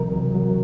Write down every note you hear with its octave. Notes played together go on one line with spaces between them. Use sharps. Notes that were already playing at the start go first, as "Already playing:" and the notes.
Already playing: C3 E3 F#3 A#4
C#2
F#3